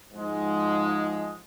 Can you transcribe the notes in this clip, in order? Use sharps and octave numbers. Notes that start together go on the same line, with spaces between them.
G#2 F3 G#3